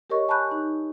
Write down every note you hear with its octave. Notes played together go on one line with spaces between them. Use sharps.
G4 A#4 C#5 D#5 C#6
G#5 A5 B5 C#6 F#6 G6
D#4